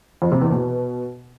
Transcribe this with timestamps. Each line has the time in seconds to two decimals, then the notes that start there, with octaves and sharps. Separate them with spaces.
0.22 F2
0.32 C3
0.41 E2
0.51 B2